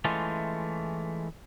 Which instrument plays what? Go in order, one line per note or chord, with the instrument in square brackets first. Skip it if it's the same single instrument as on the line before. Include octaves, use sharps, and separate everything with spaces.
[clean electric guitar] E3 G#3 A3 C#4 F4